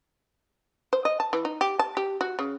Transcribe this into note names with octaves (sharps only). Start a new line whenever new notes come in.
C5
D#5
A5
E3
D#4
G4
A5
G4
F#4
C#3